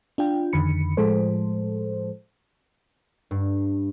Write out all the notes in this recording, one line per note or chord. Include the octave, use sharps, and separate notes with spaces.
D4 F4 G5
F2 D3 D#3 B5 C#7
A2 F3 G#3 A4 C5
G2